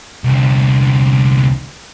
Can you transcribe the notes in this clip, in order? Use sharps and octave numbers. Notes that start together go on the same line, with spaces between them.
C2 D3